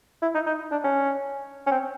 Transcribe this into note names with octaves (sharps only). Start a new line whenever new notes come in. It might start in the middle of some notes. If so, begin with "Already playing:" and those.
E4
D#4
D#4
D4
C#4
C#4
C4